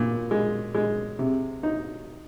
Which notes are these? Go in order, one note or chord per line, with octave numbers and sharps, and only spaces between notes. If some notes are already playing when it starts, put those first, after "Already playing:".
Already playing: A#2
G#3
G#3
C3
D#4